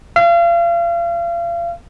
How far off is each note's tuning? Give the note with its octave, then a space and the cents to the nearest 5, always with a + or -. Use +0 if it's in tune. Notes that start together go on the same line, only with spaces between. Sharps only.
F5 -35